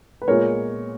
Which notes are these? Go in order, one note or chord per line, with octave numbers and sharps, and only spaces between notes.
B4
A#2 G#3 B3 A#4 C#5